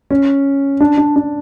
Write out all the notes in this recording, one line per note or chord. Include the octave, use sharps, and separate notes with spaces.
C#4
D4
D4
D4